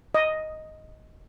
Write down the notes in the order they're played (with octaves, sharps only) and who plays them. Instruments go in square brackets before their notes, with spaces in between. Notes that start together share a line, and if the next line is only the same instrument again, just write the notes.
[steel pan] D#5